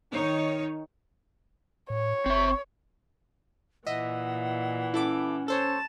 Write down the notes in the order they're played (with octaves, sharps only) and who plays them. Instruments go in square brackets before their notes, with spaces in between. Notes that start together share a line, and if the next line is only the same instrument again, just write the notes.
[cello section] D#3 D#4 C#5
[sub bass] A2 [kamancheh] C#5
[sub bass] G1 [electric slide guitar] C4 E5 [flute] C#6
[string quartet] A#2 E3 [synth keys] D#5 E5 [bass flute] F#5
[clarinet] C#4 [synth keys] E4 A4 D6
[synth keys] A4 C5 C#5 [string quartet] A5